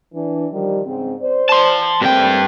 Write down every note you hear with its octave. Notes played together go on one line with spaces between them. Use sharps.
E3 D4
D#3 F3 G3
G#2 C#3 C4
C5 D5
A5 C6
G2 A3 A#3 C4 G5